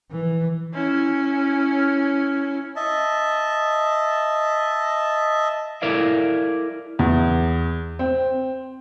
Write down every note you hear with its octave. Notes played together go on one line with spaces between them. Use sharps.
E3
C#4 E4
D#5 E5 A5
E4 A4 A#4 D5 E5 F5
E2
C4